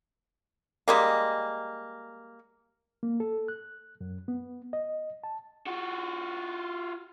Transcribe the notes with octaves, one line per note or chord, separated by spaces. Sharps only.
G3 G#3 A#3
A#3
A4
F#6
F#2
B3
D#5
A5
F4 F#4